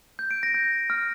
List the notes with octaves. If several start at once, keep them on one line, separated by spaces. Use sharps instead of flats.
G6
D7
A#6
G6
F6